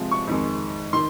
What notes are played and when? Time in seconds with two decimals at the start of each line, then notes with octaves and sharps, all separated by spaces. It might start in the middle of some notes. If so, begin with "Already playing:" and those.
Already playing: C3 F3 G#3
0.11 C#6
0.27 F2 D#3 G#3
0.93 D#3 C6